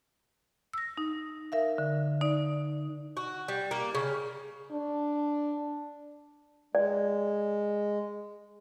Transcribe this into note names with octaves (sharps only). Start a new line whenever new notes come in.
E6 A#6
D#4
A#4 E5 F5
D3
D#4 D5
F#4
G3
A#3
C#3
D4
G#3 D5